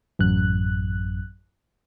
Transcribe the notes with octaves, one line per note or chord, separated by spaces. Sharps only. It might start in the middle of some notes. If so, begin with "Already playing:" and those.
A1 F#2 F#6